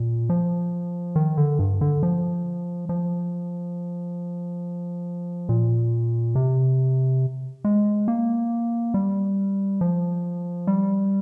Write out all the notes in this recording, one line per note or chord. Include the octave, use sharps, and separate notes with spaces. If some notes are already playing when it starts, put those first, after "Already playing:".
Already playing: A#2
F3
D#3
D3
G2
D3
F3
F3
A#2
C3
G#3
A#3
G3
F3
G3